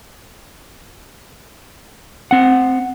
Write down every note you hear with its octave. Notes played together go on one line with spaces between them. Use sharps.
C4 F#5